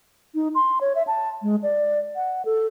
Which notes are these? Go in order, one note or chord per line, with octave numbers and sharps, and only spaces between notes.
D#4
C6
C#5
E5
A5
G#3
D5
F#5
A4